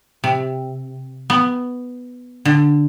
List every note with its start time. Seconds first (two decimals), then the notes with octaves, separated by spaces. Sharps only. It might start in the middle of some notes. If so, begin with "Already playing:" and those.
0.24 C3
1.30 B3
2.45 D3